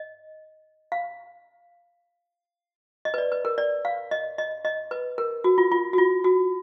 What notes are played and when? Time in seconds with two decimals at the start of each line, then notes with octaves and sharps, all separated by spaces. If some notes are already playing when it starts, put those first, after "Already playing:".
Already playing: D#5
0.92 F5
3.05 D#5
3.14 B4
3.18 D5
3.32 B4
3.45 A#4
3.58 D5
3.85 F5
4.11 D#5
4.38 D#5
4.65 D#5
4.91 B4
5.18 A#4
5.44 F#4
5.58 F4
5.72 F4
5.93 F#4
5.98 F4
6.24 F#4